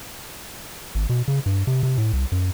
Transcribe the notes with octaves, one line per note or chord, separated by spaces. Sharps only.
G#1
B2
C#3
G2
C3
C3
A2
C2
F#2